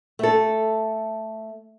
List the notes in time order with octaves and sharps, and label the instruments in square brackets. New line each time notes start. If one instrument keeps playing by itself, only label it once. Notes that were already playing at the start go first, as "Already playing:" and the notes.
[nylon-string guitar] A3 A4